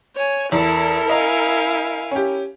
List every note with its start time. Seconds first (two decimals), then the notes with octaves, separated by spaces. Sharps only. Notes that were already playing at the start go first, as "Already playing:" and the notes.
0.16 C#5 G#5
0.52 E2 E4 A4 A#4
1.09 D#5 F5 G#5 A#5
2.11 C#4 G4